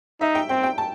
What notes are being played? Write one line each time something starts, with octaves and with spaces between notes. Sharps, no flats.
D#4 E5
G5
C4 G5
G5
A5